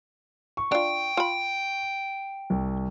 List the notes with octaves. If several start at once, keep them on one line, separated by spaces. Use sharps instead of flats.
C#6
D4 F4 G5
F4 B5
C2